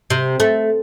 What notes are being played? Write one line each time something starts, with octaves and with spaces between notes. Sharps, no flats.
C3
A3